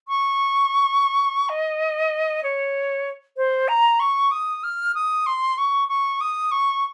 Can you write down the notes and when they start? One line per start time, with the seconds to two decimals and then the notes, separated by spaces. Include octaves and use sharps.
0.08 C#6
1.49 D#5
2.43 C#5
3.37 C5
3.68 A#5
4.00 C#6
4.31 D#6
4.64 F6
4.95 D#6
5.26 C6
5.58 C#6
5.89 C#6
6.21 D#6
6.51 C#6